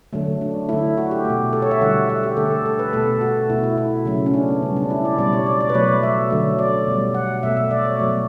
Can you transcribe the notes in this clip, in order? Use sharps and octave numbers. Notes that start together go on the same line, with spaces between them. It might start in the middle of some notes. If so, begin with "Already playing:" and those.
D3 F#3 A3
D4
D3 A3 E4
F#4
G4
A3
B2
A4
C#5
E5
D3 G3 F#5
E5
G4
D3 A3 A4
A4
B4
B2 A3 A4
F#4
B2 A3 E4
E4
E4
C#3 F#3 A3
C#4
D4
B3
C#3 G3
D4
E4
D5
B2 G3 D5
C#5
D5
D5
B4
B2 F#3 A3 C#5
E5
D3 F#3 A3
D5
B2 G3
F#5
B2 A3 E5
E5
D5
C#5
B2 F#3 A3